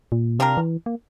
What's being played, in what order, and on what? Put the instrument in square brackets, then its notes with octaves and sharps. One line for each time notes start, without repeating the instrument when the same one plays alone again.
[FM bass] A#2
[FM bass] C3 [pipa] G3 D4 F4 A#4
[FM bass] E3
A#3